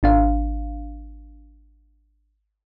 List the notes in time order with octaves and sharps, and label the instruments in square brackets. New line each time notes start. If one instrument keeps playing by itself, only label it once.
[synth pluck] G#1 D4 F5